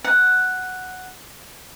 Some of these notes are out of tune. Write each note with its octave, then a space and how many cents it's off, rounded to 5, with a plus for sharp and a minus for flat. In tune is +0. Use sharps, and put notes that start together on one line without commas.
F#5 +0